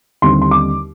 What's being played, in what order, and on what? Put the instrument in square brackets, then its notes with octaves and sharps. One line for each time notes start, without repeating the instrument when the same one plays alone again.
[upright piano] D#2 D3 G3 C4 C6
C6
D6